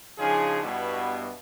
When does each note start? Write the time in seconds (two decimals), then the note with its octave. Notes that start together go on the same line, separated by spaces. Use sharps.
0.19 C#3 F3 D4 D#4 G#4
0.63 G2 B2 G3 B3 E4 F#4